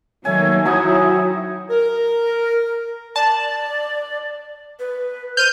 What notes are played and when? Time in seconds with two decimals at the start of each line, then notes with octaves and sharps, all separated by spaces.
0.25 D#3 F#3 A3 A#3 C#5 G#5
0.65 F#3 C4 D#4 E4 G#5 D#6
1.70 A#4
3.16 D5 A5
4.80 B4
5.37 C5 F6 G6 D#7